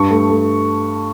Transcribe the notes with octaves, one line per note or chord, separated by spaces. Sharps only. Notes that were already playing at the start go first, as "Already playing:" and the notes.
Already playing: G2 C#6
A3
A3